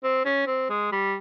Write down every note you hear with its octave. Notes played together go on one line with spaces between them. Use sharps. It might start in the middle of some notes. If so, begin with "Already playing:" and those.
C4
C#4
C4
G#3
G3